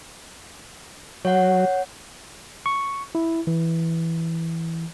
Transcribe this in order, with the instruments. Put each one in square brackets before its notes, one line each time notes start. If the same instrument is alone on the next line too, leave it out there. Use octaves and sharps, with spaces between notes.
[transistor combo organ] F#3 [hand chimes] C#5 F#5
[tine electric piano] C#6
E4
E3